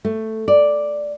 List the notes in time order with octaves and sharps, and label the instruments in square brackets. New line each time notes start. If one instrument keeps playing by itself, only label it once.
[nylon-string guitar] A3
D5